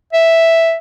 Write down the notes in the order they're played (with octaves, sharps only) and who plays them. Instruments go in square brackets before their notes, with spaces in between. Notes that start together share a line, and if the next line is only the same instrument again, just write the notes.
[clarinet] E5